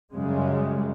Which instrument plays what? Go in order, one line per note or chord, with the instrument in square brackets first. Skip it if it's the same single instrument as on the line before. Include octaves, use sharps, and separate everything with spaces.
[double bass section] F#2 C#3 G3 G#3